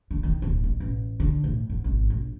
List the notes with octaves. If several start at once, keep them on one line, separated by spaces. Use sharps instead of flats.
D3
D#3
D1
A1
A1
D3
A2
G#2
G#1
A#1